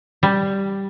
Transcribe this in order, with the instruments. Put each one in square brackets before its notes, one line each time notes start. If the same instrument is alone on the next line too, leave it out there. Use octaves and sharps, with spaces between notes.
[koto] G3